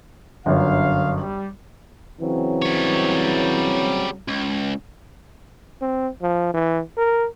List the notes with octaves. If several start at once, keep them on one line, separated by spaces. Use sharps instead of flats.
G1 F#2 D3 F5
G3
C#3 E3 F#3 C4
G3 C#5
C#2
C4
F3
E3
A#4